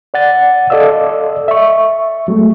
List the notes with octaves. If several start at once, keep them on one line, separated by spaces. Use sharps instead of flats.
D5 F#5 A6
A4 D5 D#5 F5 E6
E5 C#6
F#3 G#3 A3